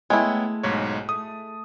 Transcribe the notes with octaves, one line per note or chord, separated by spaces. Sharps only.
G#3 A3 B3 E4 C#5 G5
B1 G#2 C#5
A3 D#6